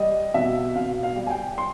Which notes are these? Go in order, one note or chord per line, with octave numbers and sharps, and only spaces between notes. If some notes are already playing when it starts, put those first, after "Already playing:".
Already playing: G3 D#5
B2 E5
B2 F5
F5
G3
G#5
G5
C6